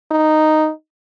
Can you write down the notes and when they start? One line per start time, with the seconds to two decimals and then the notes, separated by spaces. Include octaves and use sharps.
0.12 D#4